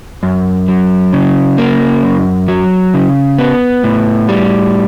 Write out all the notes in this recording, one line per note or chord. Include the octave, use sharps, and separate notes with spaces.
F#2
F#3
C#3
A#3
F#2
F#3
C#3
B3
A2
G3